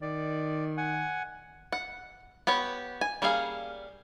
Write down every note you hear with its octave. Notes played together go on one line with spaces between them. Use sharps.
D#3 D5
F#5 G#5
F#5
B3 G4 C#5
G#5
G3 A#3 C#4 G#4 F5